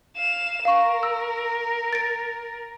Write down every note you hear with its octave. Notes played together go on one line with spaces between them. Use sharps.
F5 E7
A#4 F5 C#6
E6
A6 D7